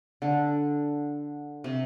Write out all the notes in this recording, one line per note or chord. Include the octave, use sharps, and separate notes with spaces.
D3
C3